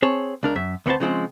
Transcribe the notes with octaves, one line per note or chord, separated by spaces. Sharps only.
C4 G#4 C#5 A5
C#2 D4 A#4
F#2 E5
D2 A3 B3 C4 C5 A5
C#3 F3 G#3 C4